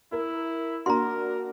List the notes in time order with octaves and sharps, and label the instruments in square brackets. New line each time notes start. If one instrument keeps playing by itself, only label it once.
[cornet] E4 [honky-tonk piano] A#4
[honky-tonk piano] A#3 D4 F#4 [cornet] A#4 [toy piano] A#5 C6